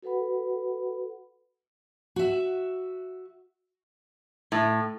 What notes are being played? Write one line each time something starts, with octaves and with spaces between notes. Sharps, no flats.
F#4 A4 B4 F#5 B5
F#4 E5
A2